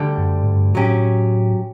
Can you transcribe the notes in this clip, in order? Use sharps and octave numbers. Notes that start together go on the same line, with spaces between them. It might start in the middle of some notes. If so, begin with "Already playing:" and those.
Already playing: D2 D3 G3
F#2
A2
G2
A2 F#3 C#4 G4